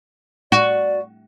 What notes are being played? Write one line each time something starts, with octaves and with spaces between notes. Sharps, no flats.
F#4 D5